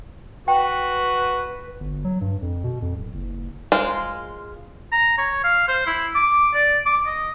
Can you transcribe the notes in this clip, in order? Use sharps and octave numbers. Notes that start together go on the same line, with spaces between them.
F#4 B4 G5
G1
F#3
G2
F2
B2
F2
D1
F#1
G#3 F4 A#4 C5
A#5
C#5
F5
C5
E4
D6
D5
D6
D#5